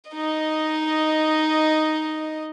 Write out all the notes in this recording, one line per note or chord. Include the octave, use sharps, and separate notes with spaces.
D#4 D#5